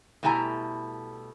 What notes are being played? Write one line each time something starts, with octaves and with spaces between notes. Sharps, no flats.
B2 G3 A3 E4 G#5 A#5